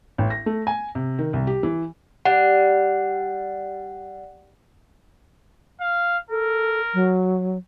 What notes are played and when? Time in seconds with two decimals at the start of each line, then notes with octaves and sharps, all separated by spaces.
0.18 A1
0.30 A#6
0.46 A3
0.67 G#5
0.95 C3
1.19 D#3
1.33 C2
1.47 G4
1.63 E3
2.25 G3 F#5
5.81 F5
6.30 A4 A#4
6.94 F#3